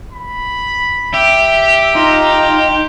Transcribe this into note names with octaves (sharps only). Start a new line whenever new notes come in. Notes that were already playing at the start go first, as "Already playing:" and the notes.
B5
G4 E5
D#4 F4 A#5